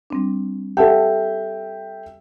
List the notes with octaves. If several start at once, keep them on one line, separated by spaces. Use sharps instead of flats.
G3 C4 D4
G4 A4 E5 F#5 G5 A5